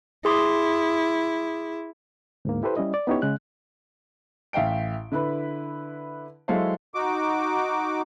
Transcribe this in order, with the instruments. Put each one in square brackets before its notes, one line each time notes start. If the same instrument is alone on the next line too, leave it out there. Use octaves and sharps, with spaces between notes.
[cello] E4 [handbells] G#4 C6 D6
[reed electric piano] D2 G#2 A#3
E4 G4 A4 B4 C5
G3 C#4 E4 D#5
D5
B3 C#4 D#4 E4 G4 C#5
C#3 G#3 F#6
[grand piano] A1 E5 F5 G5 D7
D3 E4 B4 B5
F#3 G#3 E4 A4 C5 F5
[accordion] D#4 F#4 D6